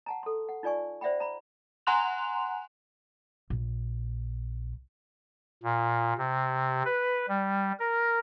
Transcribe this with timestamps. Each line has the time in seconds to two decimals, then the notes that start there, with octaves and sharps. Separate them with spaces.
0.06 F#5 A5 A#5
0.23 A4 C6
0.49 F#5
0.63 D#4 F4 D5 G#5 C#6
1.01 C5 D5 E5 F#5 G5 B5
1.20 A#5 B5
1.87 F#5 G#5 A#5 C6 F#6 F7
3.50 A#1
5.63 A#2
6.18 C3
6.85 B4
7.28 G3
7.80 A#4